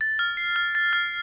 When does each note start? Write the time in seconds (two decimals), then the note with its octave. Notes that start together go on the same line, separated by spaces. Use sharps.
0.01 A6
0.19 F6
0.37 C7
0.56 F6
0.75 A6
0.93 F6